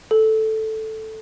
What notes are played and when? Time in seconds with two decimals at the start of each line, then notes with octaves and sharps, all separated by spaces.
0.11 A4